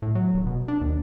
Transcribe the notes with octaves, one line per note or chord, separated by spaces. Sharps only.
A2
F#3
D#1
B2
D4
D#2